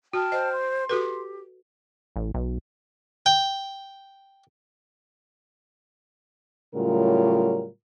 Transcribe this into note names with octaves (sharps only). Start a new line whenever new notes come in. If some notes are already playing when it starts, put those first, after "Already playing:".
F#4 G5 A5 F6
C5 D#5
C6
F#4 G4 A4 B4
A1
B1
G5
A2 C#3 F#3 G3 F4 A#4